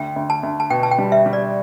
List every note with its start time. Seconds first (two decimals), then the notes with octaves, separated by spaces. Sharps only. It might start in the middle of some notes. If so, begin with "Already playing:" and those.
Already playing: D2 G5
0.16 D2
0.30 A5
0.43 D2
0.60 A5
0.70 B2 G5
0.83 A5
0.91 G5
0.98 G3
1.12 E5
1.26 G3
1.33 D5